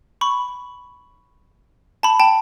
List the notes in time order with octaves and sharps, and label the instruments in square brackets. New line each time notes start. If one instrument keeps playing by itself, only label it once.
[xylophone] B5 C#6
A5 B5
G5 A5